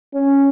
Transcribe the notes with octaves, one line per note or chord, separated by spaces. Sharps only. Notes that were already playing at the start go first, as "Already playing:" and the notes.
C#4